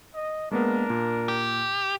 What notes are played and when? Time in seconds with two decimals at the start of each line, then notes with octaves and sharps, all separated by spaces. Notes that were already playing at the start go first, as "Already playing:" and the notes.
0.14 D#5
0.51 G#3 A#3 B3 D4 A#4
0.90 A#2
1.28 G4